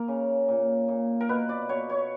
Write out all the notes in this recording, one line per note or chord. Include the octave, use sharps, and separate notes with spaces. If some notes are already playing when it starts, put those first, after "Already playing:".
Already playing: A#3 A#4
C#3
A#2
A#2
A#4
B2 B4
D5
B2 C#5
C#5